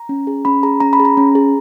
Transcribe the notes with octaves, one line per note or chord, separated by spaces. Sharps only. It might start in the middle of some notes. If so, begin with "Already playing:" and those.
Already playing: A#5
C#4
G#4
C#4 B5
G#4 A#5
C#4 A#5
B5
G#4
A#5
C#4
G#4